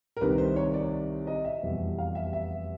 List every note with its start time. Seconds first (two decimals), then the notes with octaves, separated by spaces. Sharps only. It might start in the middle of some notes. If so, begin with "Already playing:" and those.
0.17 A#4
0.21 C2 C3 D#3 B4
0.38 C5
0.56 C#5
0.74 D5
1.27 D#5
1.45 E5
1.63 F1 E2 B2 G3
1.98 F5
2.15 E5
2.33 E5